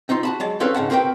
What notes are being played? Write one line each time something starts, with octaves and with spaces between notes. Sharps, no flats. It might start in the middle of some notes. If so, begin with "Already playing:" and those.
C4 D#4 F4 C6
F#4 A5 B5
F#3 G#3 A5
C4 C#4 A4 B4 C#5 F5
G#2 C#3 F#5 A5
C4 F#4 A#4 B4 G5